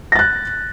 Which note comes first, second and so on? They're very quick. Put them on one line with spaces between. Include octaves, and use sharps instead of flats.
A#6 A6 F#6